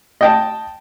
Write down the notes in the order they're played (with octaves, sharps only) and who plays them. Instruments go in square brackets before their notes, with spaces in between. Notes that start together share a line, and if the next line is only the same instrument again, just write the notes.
[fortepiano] D#5 G5 A5